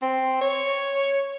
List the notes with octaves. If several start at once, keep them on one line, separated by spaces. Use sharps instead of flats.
C4
C#5